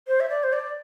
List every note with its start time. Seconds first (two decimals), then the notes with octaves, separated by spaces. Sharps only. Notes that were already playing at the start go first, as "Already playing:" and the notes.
0.07 C5
0.20 E5
0.30 D5
0.43 C5
0.53 D5